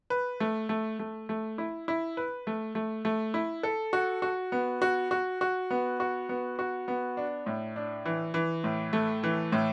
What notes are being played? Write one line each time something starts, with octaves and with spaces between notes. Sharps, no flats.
B4
A3
A3
A3
A3
E4
E4
B4
A3
A3
A3
E4
A4
F#4
F#4
B3
F#4
F#4
F#4
B3
F#4
B3
F#4
B3
D4
A2
D4
E3
E3
A2
A3
E3
A2